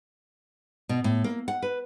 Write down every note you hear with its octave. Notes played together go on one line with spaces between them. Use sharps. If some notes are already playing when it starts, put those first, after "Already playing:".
B2
A2
A#3
F#5
B4